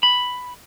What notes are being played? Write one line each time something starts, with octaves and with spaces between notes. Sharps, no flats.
B5